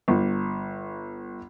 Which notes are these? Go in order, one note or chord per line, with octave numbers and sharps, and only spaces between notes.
G1